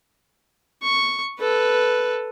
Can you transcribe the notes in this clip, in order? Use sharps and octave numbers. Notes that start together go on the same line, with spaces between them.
C#6
A4 B4